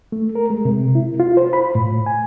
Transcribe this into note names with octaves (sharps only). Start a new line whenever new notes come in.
A3
A#4
G#3
C3
E4
F4
C5
B5
A2
G#5